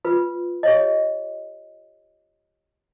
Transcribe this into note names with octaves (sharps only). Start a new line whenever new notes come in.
F4 B4
G4 C#5 D#5